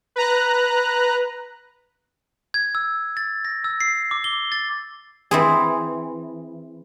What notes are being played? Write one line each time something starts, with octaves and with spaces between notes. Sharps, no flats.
B4 A#5 F#6
G#6
E6
A6
A#6
E6
C7
D6
G7
A6
E3 C4 G#4